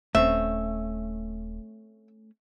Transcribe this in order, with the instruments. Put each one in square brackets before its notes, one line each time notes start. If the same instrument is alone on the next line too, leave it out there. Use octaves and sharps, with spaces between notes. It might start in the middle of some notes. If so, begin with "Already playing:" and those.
[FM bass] D#1 [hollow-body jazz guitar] A3 C4 C#4 [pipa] E5